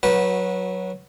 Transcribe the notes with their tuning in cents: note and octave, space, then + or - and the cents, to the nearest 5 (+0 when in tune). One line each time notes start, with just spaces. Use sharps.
F#3 +0 F#4 -15 B4 -20